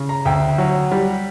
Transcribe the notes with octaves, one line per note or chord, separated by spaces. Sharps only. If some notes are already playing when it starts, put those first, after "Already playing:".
Already playing: C#3
A#5
D2 G5
F#3
G3